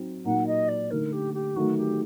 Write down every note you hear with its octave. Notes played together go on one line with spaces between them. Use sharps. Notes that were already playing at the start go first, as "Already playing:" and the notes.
Already playing: F#3 C4 D#4
A#2 F#3 A#3 D#4 F#5
D#5
D5
D3 A3 D#4 A#4
G4
G4
D#3 F#3 A3 F#4
G4